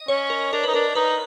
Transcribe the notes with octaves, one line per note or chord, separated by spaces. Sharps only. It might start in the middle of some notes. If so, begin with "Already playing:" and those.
Already playing: D#5
C#4 C#5
A#4
D4 A#4
D#4 B4
D4 A#4
D#4 B4